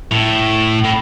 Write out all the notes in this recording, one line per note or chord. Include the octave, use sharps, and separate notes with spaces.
A2
A2